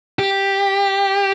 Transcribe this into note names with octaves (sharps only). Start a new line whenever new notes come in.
G4